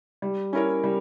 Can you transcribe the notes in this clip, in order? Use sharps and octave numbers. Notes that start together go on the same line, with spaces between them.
G3
C#4 E4 A#4 C#5
G3